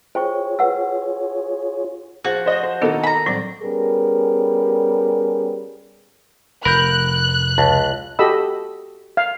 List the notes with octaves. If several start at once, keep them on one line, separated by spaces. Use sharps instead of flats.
F4 G#4 C5 C#5 G5 C#6
B4 F#5 E6
F3 F#4 G#4
C5 D#5
C5
B2 D#3 A#3 B3 D4 D#4 A4
A#5 B5
A2 F#3 G3 C4 D5
G3 B3 C#4 G#4 A#4
F1 A#4 B5 F#6 G6
C#2 A5
F#4 G4 A4 D#5 B5 E6
F5